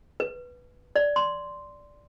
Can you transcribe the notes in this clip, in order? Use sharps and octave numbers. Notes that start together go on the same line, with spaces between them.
B4
D5
C6